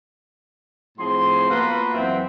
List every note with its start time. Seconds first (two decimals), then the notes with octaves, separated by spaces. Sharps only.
0.98 A2 F3 C4 G#4 C6
1.49 A#3 B3 F4 F#4 B4
1.94 F#2 E3 C4 E5 F#5 G5